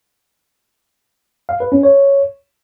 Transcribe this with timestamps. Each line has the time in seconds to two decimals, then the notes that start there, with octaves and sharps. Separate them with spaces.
1.49 F5
1.60 B4
1.72 C#4
1.83 C#5